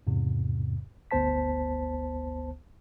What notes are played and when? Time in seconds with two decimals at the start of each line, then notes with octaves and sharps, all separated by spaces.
0.07 E2 G#2 C3
1.11 G1 D2 B3 C5 A5 B6